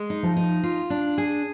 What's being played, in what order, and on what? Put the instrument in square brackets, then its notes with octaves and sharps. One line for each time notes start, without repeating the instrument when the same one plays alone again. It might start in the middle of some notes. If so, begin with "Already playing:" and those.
Already playing: [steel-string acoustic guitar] G#3
D#4
[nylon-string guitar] F3
[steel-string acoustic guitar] D#4
F4
D4
G#4